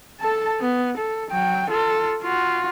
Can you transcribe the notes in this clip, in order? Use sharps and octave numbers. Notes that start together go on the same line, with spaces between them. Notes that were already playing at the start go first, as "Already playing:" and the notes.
A4 A5
B3
A4
F#3 G5
F4 A4
F4 F#4